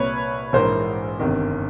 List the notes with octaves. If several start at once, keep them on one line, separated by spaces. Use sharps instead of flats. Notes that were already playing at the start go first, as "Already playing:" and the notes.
Already playing: C2 A#2 B4 C#5
A#1 G#2 E3 A#4 C5
G1 F2 C3 D#3